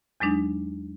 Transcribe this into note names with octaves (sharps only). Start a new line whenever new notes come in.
E2 F#3 G#3 D4 D#4